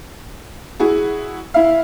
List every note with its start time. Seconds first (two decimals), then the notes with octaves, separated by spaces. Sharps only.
0.80 E4 F#4 G#4
1.54 E4 E5 F5